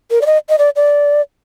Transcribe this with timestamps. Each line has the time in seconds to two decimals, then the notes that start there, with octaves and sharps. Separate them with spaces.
0.11 A#4
0.21 D5
0.26 D#5
0.49 D#5
0.58 D5
0.76 D5